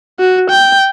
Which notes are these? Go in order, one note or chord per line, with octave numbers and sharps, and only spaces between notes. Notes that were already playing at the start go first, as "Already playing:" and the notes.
F#4
G5